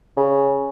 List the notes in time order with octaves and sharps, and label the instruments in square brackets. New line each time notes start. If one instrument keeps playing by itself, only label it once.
[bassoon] C#3